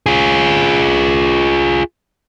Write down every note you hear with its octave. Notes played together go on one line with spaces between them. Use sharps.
F4 G#4